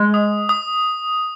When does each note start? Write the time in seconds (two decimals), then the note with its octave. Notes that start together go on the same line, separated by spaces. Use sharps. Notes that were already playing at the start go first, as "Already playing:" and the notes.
Already playing: G#3
0.14 D#6
0.49 D#6